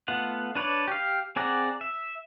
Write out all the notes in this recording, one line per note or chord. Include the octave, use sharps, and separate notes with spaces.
A3 B3 F4 F#5
D4 B4 C#5 D5
G4 F5
C4 G#4 D5 F#5 A#5
E5